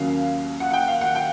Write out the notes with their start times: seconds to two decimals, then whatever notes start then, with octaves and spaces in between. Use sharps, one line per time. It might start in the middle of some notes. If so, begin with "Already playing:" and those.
Already playing: D#2 C#3 F#3 A#3 C#4 F5
0.60 F#5
0.71 F#5
0.73 G5
0.88 F5
1.01 F#5
1.15 G5